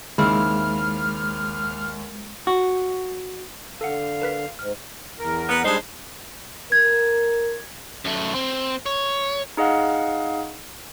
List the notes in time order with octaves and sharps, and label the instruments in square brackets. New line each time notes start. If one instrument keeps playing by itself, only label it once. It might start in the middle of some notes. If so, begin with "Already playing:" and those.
[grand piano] D#2 [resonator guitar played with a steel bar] C#3 C4 E4 [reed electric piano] G#3 [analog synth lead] F6
[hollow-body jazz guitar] F#4
[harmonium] D3 [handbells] A4 F#5 [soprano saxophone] F5
[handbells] A#4 B4 B6
[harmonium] G#2 [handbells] F6
[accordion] E2 A#4
[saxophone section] B3
[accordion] G3 G#3 G#4 [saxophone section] D4 D#4 C5
[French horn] A#4 [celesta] G#6
[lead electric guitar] F#2 A3
C4
C#5
[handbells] D#4 G#4 D#5 F5 F#5